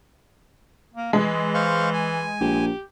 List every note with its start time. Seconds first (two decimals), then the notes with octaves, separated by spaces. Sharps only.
0.94 A#3
1.13 E3 G#3
1.54 C5 F5 C#6
1.93 G#5
2.41 A#1 G4